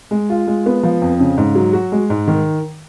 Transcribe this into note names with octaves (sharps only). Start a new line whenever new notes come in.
G#3
F4
G#3
B3
F3
F2
C#3
G#2
F#3
F#4
G#3
G#2
D#3